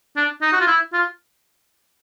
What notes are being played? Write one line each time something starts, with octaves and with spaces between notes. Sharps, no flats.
D4
D#4
F#4
F4
E4
F4